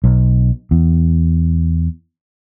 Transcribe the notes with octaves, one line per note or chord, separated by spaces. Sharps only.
B1
E2